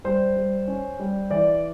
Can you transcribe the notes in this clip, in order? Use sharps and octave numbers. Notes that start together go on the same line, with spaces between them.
G3 C5
G3
C#4
G3
E3 D5